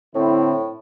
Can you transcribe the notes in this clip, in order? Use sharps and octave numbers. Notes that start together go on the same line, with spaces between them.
A2 D3 C4 E4